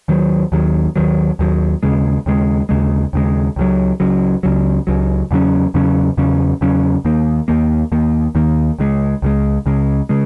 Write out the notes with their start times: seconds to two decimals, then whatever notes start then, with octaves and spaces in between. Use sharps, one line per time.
0.08 D#2 D#3 F#3
0.52 D#2 D#3 F#3
0.96 D#2 D#3 F#3
1.39 D#2 D#3 F#3
1.83 D#2 C#3 G#3
2.26 D#2 C#3 G#3
2.69 D#2 C#3 G#3
3.13 D#2 C#3 G#3
3.56 C#2 C#3 F#3
4.00 C#2 C#3 F#3
4.43 C#2 C#3 F#3
4.87 C#2 C#3 F#3
5.31 E2 C#3 F#3 C#4
5.74 E2 C#3 F#3 C#4
6.18 E2 C#3 F#3 C#4
6.61 E2 C#3 F#3 C#4
7.05 D#2 D#3 A#3
7.48 D#2 D#3 A#3
7.92 D#2 D#3 A#3
8.35 D#2 D#3 A#3
8.79 C#2 C#3 G#3
9.22 C#2 C#3 G#3
9.66 C#2 C#3 G#3
10.09 C#3 G#3